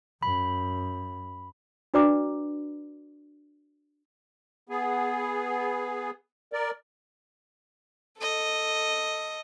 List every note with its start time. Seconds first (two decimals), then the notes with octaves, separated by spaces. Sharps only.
0.23 F#2 B5
1.94 D4 F#4 B4 D5 A#5 D6
4.69 B3 G#4
6.53 A#4 D5
8.18 A4 D#5